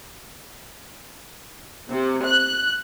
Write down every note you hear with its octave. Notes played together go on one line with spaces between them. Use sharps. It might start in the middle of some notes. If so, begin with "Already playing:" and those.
C3
F#6